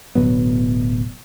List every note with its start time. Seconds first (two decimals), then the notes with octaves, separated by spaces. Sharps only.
0.15 D1 B2 F#3 B3